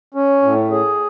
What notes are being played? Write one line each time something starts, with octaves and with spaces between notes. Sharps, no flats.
C#4
A2
G#4